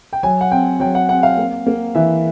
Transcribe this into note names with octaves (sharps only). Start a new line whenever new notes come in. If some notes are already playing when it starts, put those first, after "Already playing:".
G5
F#3 G#5
F#5
C4 G5
F#3 G5
F#5
C4 F#5
F5
A#3
A#3
E3 E5